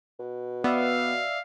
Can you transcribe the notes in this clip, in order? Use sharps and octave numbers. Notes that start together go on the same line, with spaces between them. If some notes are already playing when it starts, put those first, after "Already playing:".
B2
B3 D5 E5 F5 E6